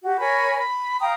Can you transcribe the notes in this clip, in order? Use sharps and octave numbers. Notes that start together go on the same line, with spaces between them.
F#4 G4
A#4 C#5 G#5 B5
B5
F5 G5 A#5 D#6